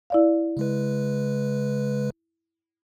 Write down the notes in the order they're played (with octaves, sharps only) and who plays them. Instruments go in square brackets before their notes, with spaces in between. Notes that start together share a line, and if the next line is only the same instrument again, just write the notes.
[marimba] E4 D5 F5
[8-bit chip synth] C#3 G#3 B4